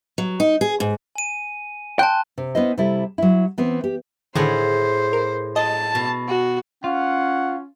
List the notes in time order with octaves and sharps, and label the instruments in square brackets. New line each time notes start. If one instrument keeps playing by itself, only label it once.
[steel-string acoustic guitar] F#3
D#4
G#4
G#2
[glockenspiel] G#5 D#7
[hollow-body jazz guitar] G5 [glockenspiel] A5 C6 F#6
[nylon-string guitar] C3
B3 C#4 E4 C5 D#5
C3 G3 E4 A4
F#3 E4
E3 B3 C4
G4
[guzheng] A2 G#4 F#5 [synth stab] D3 D#3 [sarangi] C5
[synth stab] A#4
[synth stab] D#5 [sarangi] A5
[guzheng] B2
[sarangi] F#4
[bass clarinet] C#4 [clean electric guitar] F4 [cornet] F#5